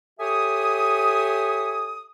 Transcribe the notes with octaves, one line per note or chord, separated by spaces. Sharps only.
G4 A4 C#5 E5 G#5 D#6